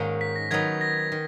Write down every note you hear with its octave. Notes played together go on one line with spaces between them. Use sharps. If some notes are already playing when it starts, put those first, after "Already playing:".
Already playing: G#2 D#3 A#3 C#4
B6
A#6
D#3 F#3 B3 D#4 G#6
A#6
D#3